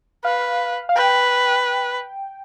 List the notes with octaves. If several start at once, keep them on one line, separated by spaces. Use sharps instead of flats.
B4 F5
F5
B4 G5